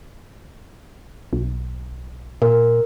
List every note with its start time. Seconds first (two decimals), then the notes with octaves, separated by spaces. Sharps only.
1.33 B1
2.42 A#2 A#4